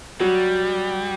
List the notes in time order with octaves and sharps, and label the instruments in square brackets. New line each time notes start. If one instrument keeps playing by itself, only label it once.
[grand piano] F#3 [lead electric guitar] G3